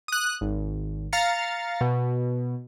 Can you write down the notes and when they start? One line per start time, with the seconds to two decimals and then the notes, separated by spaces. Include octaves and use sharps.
0.08 D#6 F#6
0.41 G#1
1.13 F5 A#5 A6 C#7
1.81 B2